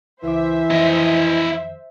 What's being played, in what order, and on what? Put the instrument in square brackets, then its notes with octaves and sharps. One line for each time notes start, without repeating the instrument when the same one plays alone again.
[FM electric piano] C#2 D6 [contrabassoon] E3 [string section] C5 E5
[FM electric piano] F2 D#3 F3 [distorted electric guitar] E4 D#5